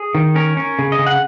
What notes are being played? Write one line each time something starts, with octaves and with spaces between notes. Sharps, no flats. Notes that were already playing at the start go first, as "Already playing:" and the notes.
Already playing: G#4
D#3
C#4 A#4
C#4
C#3
D#5
C#3
F#5